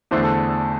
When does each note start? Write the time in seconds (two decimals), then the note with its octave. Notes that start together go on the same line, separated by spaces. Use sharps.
0.11 E2 D3 A3 D4 C5
0.23 A4